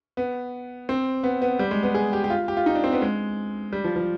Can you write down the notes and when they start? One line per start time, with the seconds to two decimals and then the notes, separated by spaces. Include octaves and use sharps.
0.17 B3
0.89 C4
1.24 B3
1.42 B3
1.59 G3
1.71 G#3
1.83 B3
1.95 G#4
2.13 G4
2.24 G4
2.30 F4
2.48 G4
2.57 F4
2.66 D#4
2.75 D4
2.84 C4
2.93 B3
3.02 G#3
3.73 G3
3.84 F3
3.96 F3